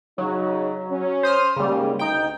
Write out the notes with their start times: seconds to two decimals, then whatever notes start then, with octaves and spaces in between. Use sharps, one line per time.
0.18 C#3 F#3 D#4
0.89 C#4
1.23 C5 D#6 F6
1.56 G#2 C#3 G3 A#3
1.99 D2 D#4 G5